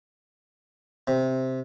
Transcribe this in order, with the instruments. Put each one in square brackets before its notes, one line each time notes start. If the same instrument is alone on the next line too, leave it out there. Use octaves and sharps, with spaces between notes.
[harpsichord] C3